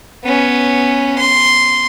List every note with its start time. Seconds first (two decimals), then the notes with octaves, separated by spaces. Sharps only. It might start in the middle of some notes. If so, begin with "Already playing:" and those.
0.25 B3 C#4
1.18 C6